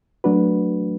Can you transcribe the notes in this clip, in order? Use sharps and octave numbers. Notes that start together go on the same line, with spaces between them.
F#3 A3 D4 F#4 B4